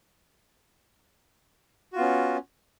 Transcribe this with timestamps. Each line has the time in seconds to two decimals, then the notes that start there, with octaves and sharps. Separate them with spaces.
1.93 F#4
1.96 F4
1.98 B3
2.01 C#4